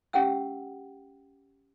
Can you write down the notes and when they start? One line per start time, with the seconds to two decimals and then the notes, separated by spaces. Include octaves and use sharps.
0.13 C#4 G4 F#5 G5 E6